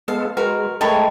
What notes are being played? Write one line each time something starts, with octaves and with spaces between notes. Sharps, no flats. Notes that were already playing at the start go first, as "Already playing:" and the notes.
G#3 B3 A4 F5
G#3 F#4 A#4 B4 B5 F6
G#3 A3 A4 A#4 C#5 D#5 G5 B5